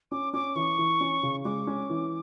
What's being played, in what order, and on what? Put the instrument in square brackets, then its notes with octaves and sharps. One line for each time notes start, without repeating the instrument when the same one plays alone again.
[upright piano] C#4 [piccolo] D6
[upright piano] C#4 [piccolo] D6
[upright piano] E3 [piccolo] C#6
[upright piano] E3
C#4
C#3
[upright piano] G#3 [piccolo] D6
[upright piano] C#4
E3